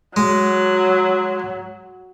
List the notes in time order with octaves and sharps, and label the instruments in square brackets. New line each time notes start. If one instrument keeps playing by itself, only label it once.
[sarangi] F#3 [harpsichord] G#3